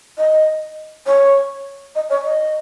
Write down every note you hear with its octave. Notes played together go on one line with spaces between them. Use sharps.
D#5
C#5
D#5
C#5
D#5